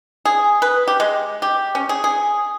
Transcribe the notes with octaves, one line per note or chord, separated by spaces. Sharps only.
G#4
B4
G4
G#3
G4
C#4
G#4
G#4